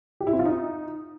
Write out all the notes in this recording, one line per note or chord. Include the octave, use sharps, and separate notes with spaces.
G4
E4
C4
F4
D#4